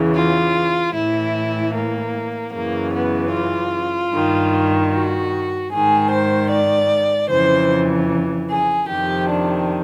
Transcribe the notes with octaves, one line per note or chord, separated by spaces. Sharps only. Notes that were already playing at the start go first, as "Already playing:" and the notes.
Already playing: E2 C#3 E3
F4
A2 E3 E4
A#3
F#2 C#3 E3 A#3
B3
F4
G2 D#3
F#4
G#2 D#3 G#4
C5
D5
F2 C#3 E3 C5
G#4
F2 C3 D#3 G4
D4